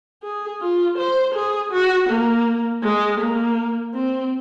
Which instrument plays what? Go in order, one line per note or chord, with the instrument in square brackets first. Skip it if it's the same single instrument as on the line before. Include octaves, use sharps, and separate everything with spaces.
[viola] G#4
F4
C5
G#4
F#4
A#3
G#3
A#3
C4